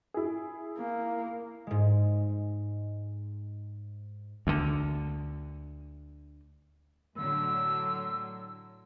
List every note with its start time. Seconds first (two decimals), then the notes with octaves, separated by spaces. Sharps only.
0.14 E4 G#4
0.78 A#3
1.67 G#2 G#3
4.47 D2 D3
7.17 A2 D3 F#3 E6